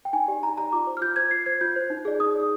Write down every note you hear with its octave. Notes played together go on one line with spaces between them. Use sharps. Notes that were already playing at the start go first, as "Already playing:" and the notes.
G5
D#4 G#5
G4 D5
D#4 A#5
G4 D5 A#5
F4 D6
C5
F6
F4 G6
C5 G#6
F4 C7
C5 G#6
F4 G6
C5
D#4
G#4 D5
D#4 D#6
G#4 D5